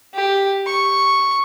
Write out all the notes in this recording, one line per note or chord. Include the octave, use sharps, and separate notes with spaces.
G4
C#6